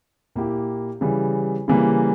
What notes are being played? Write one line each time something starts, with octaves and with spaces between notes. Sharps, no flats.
A#2 A#3 E4 G4
C#3 E3 G3
C#3 E3 G3 A#3